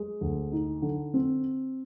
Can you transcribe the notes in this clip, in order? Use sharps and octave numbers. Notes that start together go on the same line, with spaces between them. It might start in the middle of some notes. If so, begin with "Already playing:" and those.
Already playing: G#3
D2
D#4
D3
C4